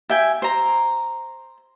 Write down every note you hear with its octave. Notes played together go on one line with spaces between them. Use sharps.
E5 G5 G#5
C5 A#5